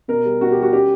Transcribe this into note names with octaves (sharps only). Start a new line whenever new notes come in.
B2 A#4
G3
B2 F#4
G4
G3
F#4
C#4 G4